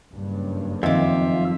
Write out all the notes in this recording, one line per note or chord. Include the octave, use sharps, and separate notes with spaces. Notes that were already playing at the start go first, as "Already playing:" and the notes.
F#1 G2
F2 D#3 F4 E5 D6